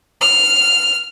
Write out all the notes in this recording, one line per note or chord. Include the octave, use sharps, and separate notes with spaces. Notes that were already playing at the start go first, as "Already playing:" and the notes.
F6